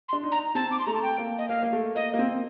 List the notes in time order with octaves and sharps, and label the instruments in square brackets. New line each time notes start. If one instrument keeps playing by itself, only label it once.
[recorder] C6
[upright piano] D4
D#4
[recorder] A#5
[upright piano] C4 [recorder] A5
[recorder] D6
C6
[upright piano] A3 [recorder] A#5
[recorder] A5
G5
[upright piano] A#3
[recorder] D#5
[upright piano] A#3 [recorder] F5
[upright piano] A#3
A3
[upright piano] A#3 [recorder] D#5
[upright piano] A#3
C4